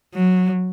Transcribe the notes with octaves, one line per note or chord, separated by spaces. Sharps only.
F#3